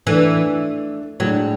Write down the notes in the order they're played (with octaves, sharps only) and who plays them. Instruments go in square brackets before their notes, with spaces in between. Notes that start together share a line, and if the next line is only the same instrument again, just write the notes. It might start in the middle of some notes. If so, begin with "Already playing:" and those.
[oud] E3 [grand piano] A3 D4 A4
[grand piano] A2 G#3 D4 [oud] F#3